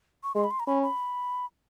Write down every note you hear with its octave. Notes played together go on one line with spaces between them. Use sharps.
C#6
G#3 C6
B5
C6
A#5
C#4 B5
B5